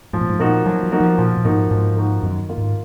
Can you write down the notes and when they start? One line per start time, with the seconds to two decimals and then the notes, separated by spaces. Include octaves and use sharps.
0.13 G#2 F3
0.21 A#2
0.29 G#2
0.39 A#2 A#3 D#4 F#4
0.66 F3 F#3
0.84 F#3
0.92 A#3 D#4 F#4
1.00 F3
1.18 A#2 F3
1.37 A#2
1.44 G#2 A#3 D#4 F#4
1.70 G#2 F3
1.97 A#3 D#4 F#4
2.23 F#2 D#3
2.49 A#3 F4
2.58 G#2